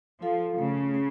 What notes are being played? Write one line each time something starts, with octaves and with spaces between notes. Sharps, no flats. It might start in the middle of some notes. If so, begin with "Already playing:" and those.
F3 F4 A4 F5
C#3 A3
C#4